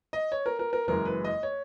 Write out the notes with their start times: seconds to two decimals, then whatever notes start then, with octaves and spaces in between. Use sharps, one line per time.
0.13 D#5
0.32 C#5
0.46 A#4
0.59 A#4
0.73 A#4
0.87 F#1 F#2 E3 G#3 A#4
1.05 B4
1.24 D#5
1.43 C#5